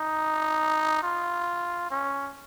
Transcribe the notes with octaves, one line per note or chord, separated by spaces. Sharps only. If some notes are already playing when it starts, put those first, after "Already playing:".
Already playing: D#4
F4
C#4